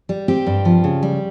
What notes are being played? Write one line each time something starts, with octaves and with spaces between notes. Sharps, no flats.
G3
C4 G4
G2
F3
C#3
G3